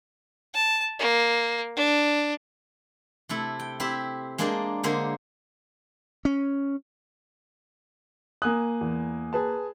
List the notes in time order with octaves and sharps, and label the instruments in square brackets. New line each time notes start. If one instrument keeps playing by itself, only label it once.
[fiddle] A5
A#3
D4
[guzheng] C3 A3 E4
G5
C4 E4 G4 E5
G#3 A#3 D4 G#4 D5 G5
D3 G#3 A#3 G#4 C5
[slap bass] C#4
[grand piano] A#3 G#5 F#6 [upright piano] D#6
[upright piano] E2
G#4 B4 A5